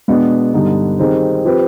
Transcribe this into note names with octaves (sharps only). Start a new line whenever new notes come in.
B2 G#3 B3 D4
G2 D3 G3 B3 D#4
D#3 G3 C4 D#4 G#4
F3 C4 G4 B4